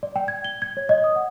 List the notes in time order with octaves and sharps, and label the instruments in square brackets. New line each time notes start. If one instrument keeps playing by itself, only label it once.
[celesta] D5
G5
G#6
G7
G#6
C#5
D#5
D#6
F#5